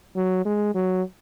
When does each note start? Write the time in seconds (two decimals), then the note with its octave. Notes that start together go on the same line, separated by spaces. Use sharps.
0.16 F#3
0.46 G#3
0.75 F#3